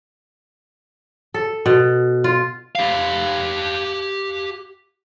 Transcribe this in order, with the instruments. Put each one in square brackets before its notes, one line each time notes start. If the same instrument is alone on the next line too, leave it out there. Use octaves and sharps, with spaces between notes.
[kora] A4
B2
F4
[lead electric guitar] G4 F5